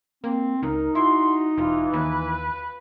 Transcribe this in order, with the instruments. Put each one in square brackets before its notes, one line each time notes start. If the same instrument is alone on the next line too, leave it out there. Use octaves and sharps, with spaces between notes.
[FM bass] A#3 [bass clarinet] C4
[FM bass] C#2 [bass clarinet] D#4 [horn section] A#4
[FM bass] E4 [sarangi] F#4 [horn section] C6
[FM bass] E1 [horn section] E3 [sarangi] F4
[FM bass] D#2 [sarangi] B4